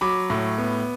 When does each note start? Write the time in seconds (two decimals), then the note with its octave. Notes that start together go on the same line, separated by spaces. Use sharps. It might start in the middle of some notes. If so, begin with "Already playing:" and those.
0.01 F#3 B5 D6
0.30 A2
0.58 B3